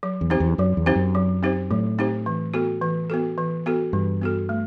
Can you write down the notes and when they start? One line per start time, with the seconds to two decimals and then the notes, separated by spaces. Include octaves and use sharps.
0.03 F#3
0.21 E2
0.30 C4 D#4 G4 C5
0.40 E2
0.58 F#2 F#3
0.77 E2
0.86 C4 D#4 G4 C5
0.96 F#2
1.15 F#3
1.43 C4 D#4 G4 C5
1.71 A2 F#3
1.98 C4 D#4 G4 C5
2.26 E3
2.54 B3 F#4 A4
2.82 E3
3.10 B3 F#4 A4
3.38 E3
3.66 B3 F#4 A4
3.93 G2 E3
4.22 B3 F#4 A4
4.49 A3